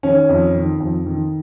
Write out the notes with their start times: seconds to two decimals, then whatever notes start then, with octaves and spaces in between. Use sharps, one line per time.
0.03 D#3 C#4
0.29 F2
0.54 D#3
0.80 F2
1.06 D#3